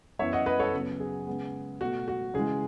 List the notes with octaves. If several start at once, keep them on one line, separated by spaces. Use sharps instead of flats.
F#2 E3 B3 C#5 E5
D#5 F#5
B4 D#5
A4 C#5
C#3 F#3 B3
G#4
C#3 G#3 B3
B2 A3 F#4
F#4
C#3 E3 G#3 G#4